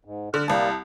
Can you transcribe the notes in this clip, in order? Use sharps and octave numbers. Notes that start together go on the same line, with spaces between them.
G#2
D3 F6 F#6
C2 G3 A#3 A5